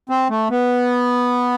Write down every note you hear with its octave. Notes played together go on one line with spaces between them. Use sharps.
C4
A3
B3